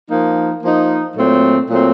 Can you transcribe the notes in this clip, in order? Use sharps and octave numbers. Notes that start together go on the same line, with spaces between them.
F3 A#3 D#4
F3 A#3 D#4
A#2 F#3 A3 C4
A#2 F#3 A3 C4